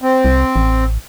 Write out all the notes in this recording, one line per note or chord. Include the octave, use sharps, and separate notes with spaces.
C4
C2
A1